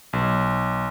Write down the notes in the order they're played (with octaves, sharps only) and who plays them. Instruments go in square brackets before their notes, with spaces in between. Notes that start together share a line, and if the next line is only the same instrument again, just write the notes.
[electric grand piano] B1